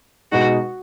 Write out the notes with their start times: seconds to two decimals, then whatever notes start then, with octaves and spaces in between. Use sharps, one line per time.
0.32 B2 G#3 D#4 F#4